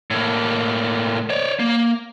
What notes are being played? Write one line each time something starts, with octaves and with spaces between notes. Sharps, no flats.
A2 A#3
C#5 D5
A#3